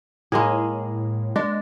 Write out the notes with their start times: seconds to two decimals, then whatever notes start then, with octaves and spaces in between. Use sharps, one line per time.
0.32 A2 G#3 A#3 G#4
1.36 G#3 D4